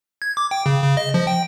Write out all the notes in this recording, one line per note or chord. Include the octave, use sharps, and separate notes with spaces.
G#6
D6
G5
C#3
C#3
D#5
F3
G5